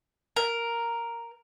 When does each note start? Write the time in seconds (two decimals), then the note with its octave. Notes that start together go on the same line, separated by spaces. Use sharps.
0.36 A#4